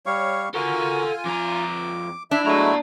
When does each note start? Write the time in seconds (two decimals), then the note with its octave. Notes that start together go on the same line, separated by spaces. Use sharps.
0.06 G3 C#5 F5 C#6
0.54 F4 F#4 A4 A#4 F#5 G#5
1.25 F2 A#5 D6
2.31 D4 E4 E5
2.46 F#3 G#3 A3 E4 F#4 D5 A#5